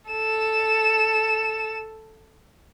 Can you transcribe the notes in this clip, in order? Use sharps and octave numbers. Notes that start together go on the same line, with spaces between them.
A4 E7